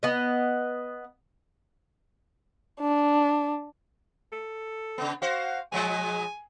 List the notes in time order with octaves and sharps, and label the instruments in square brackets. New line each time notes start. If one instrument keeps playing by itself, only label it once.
[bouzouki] B3 D#5
[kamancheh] D4
[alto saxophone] A4
[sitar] C#3 B3
[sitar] F#4 C5 [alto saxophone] F5
[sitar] B2 F3 G#3 [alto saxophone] G#5